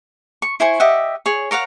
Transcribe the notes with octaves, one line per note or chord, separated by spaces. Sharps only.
C#6
E4 C5 G#5 C#6
G4 D#5 E5 F#5
G#4 C#5
A#4 C#5 F5 F#5